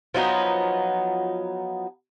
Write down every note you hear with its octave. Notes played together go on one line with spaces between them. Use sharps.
F3 F#3 B3 D#4